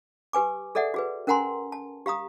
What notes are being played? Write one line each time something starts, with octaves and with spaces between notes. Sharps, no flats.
G4 B4 G#5 D6
G#4 A4 D5 E5 F#5
F#4 G#4 B4
C#4 A#4 F#5 G#5 A#5 C6
A5
G4 F5 A#5 D#6